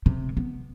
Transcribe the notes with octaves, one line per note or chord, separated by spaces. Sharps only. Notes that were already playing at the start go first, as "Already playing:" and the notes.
C3
B3